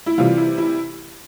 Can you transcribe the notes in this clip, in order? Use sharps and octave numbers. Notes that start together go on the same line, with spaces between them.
E4
C3 E3 G3 F4
E4
E4